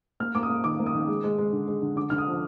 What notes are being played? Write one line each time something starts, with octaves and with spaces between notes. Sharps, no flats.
A#3 F6
A#3 D6
D#6
A#3
D#3 D6
A#3
D#6
D#3
G#3
G#3
G#3
D3
G#3
D3
D3 D6
D3 F6
D#6
F3